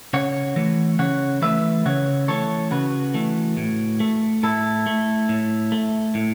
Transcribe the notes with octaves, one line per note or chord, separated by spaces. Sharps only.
C#3 C#5 F#5
E3 A3
C#3 C#5 F#5
E3 A3 B4 E5
C#3 C#5 F#5
E3 A3 A4 C#5
C#3 F#4 B4
E3 A3
A2
A3
A2 E4 A4
A3
A2
A3
A2